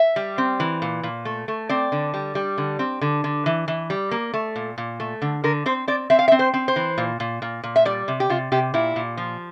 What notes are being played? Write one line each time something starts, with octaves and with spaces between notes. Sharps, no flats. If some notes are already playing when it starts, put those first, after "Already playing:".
Already playing: E5
G3
C4
E3
A#2
A#2
A3
A3
C4 D5
D3
G3
G3
D3
C4
D3
D3
E3
E3
G3
A#3
A3
A#2
A#2
A3
D3
D3 A#4
C4 C5
C4 D5
C4 E5
F5
E5
C4
C5
C4
C5
E3
A#2
A#2
A#2
A#2
E5
G3 D5
C3
G4
C3 F4
C3 G4
A#2 E4
A#2
F3